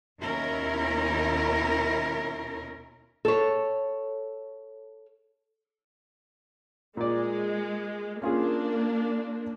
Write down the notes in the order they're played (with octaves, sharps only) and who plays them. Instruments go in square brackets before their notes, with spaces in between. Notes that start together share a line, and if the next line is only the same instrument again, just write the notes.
[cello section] D#2 B2 C#4 E4 A#4
[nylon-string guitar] A4 C#5
[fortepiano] A#2 D5 [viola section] G#3
[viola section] A#3 D4 [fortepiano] C#4 F4 G#4